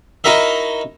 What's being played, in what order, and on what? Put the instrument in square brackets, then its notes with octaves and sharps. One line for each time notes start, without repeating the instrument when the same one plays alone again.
[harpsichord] D#4 E4 F#4 A#4 D#5 E5